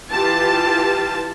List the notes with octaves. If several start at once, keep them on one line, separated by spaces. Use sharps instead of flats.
E3 F4 G4 A5